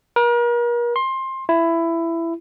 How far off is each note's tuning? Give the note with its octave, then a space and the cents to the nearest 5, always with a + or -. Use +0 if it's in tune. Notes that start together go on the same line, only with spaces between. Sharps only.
A#4 +40
C6 +20
E4 +15